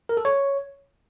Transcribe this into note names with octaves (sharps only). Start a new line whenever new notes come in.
A#4
A4
C#5